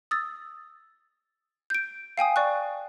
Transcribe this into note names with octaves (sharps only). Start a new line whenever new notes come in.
D#6 E6 A6
G6 D7
F5 G5 G#5 D#6
D5 C#6 F#6